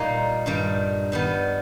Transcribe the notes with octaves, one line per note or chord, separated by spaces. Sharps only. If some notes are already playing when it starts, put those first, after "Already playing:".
Already playing: A#2 G3 A#3 D#4
G2 D#3 G3
D#3 G3 B3